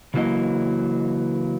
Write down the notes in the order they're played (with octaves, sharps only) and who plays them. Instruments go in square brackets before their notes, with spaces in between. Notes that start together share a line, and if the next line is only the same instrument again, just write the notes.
[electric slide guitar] C#3 E3 F#3 A#3 D#5